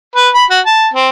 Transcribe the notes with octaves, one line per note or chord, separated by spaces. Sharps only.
B4
B5
F#4
A5
C4